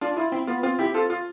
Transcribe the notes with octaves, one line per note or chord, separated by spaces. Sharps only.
D4 F4
E4 F4
C4 E4
B3 F4
C4 F4
E4 G4
F4 A4
F4